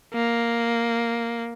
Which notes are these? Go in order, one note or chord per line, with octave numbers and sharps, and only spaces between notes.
A#3